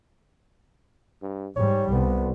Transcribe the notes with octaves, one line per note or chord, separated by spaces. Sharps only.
G2
G#2 G3 C#5
C2 B3